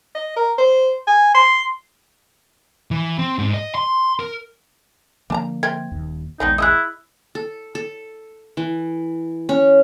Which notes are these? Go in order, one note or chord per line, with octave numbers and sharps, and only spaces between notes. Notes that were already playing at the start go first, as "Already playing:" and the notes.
D#5
A#4
C5
G#5
C6
E3
C4
G#2
D#5
C6
A#4
D3 F3 A#3 D4 A5 A#5
C4 A#4 E5 G#6
D#1 D#2
A#1 D#2 G#3 B3 C4 D4 D#4
E4 G#4 A4 D#5 D#6 F#6
A4
A4
E3
C#4